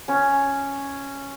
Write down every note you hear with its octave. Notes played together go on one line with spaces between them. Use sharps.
C#4